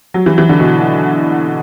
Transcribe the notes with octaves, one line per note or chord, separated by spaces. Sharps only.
F#3
E3
E3
D3
B2